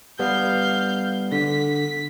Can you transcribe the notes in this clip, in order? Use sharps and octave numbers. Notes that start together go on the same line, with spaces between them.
G3 B3 F5 G6
D3 B6